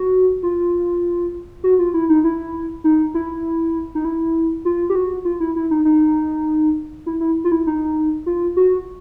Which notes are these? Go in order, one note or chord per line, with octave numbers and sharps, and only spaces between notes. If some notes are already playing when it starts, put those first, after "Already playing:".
Already playing: F#4
F4
F#4
F4
E4
D#4
E4
D#4
E4
D#4
E4
F4
G4
F#4
F4
E4
E4
D#4
D#4
E4
E4
F4
E4
D#4
F4
F#4